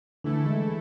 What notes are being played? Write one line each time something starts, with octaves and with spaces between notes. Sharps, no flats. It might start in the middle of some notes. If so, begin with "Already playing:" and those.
D3 E3 A3 E4 A4
G#3